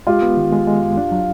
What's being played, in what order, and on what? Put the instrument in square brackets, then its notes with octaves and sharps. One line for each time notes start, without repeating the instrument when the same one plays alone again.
[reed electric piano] G#3 [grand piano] F4 G4
[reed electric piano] B3
D#3
G#3
G#3
F#2
D4
F#3